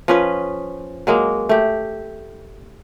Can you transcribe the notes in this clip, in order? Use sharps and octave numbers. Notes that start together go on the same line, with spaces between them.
F3 C#4 B4
F#3 G#3 A#3
A3 G4